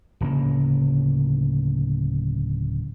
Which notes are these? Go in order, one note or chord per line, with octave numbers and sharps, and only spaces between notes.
D1 C#3 A#3